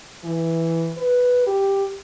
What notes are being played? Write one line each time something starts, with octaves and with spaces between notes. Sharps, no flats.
E3
B4
G4